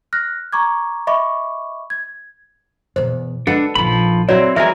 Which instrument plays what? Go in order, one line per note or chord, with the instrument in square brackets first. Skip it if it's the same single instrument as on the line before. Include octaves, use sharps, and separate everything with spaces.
[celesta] F6 F#6 A#6
A#5 C#6 D6 G#6
D#5 E5 B5 C#6 D6
G#6
[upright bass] E2 B2 [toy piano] C5
[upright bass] G#3 [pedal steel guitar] D4 [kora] A4 B4 F#5
[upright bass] A#1 D#4 [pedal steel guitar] F3 B5
[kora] F#3 E4 [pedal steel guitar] C4 [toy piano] C#5 D5 A#5
[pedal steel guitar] E3 G#5 [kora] G#3 E4 A#4 [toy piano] E5